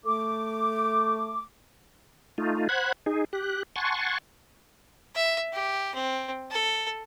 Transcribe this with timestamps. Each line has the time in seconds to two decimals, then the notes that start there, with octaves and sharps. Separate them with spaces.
0.05 A3 D6
2.38 A3 D#4 F4
2.69 C5 F#5 B5 F#6 G#6
3.06 D#4 G#4
3.33 G4 F#6
3.76 F#5 G#5 A5 C6 C#6
5.15 E5
5.53 G4
5.95 C4
6.51 A4